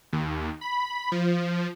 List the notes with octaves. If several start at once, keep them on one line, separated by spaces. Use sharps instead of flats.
D#2
B5
F3